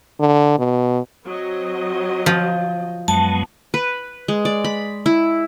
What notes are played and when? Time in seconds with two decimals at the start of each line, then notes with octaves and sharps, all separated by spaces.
0.20 D3
0.58 B2
1.25 F#3 C4 D#5
2.26 F3
3.08 F#2 F#3 G#3 B3 A5
3.74 B4
4.28 G#3
4.45 D5
4.64 B5
5.06 E4